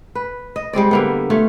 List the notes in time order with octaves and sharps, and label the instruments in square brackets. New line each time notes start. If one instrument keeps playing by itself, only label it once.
[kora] B4
D#5
G3 G#3 C4 D5
D3 A#3 B3
A3 F4 C#5